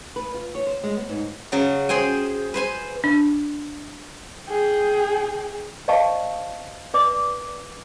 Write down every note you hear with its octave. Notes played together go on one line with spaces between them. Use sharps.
B4
F4
C#5
C5
G#3
B3
G#2
C#3 F#3
G#4 C5 G5 G#5
B4 C5 G#5
D4
G#4 G5
C5 D5 D#5 F5 A5 C#6
B4 D5 D6